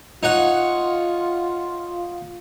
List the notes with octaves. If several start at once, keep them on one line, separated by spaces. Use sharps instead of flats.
D#4 F4 C#5 F#5